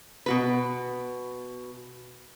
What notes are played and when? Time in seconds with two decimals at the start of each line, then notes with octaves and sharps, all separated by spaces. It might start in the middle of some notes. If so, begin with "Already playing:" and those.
0.26 B2 F#4 B4